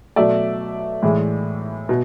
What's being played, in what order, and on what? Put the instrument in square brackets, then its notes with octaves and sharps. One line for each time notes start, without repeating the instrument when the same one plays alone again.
[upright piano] B2 F#3 A3 D5 E5
A2 E3 G#3
B2